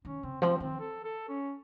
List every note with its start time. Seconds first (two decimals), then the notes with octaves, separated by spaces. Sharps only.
0.05 D#3 C#4
0.23 C#3 C4
0.42 F3 C4
0.60 D#3 C4
0.79 A4
1.04 A4
1.29 C#4